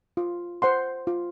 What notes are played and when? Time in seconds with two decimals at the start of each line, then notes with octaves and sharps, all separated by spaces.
0.17 F4
0.62 C5 F#5 C6
1.07 F4